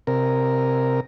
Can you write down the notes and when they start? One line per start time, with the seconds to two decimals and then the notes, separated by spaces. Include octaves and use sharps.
0.07 C3 A#4